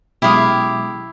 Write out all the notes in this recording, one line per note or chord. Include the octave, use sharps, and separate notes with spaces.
B2 F#3 G#3 E4 G4 F5 D#6